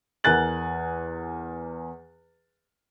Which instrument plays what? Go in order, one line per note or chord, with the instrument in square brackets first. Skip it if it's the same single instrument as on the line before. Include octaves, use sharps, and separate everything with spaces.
[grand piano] E2 A#4 G#5 F#6 A6 F#7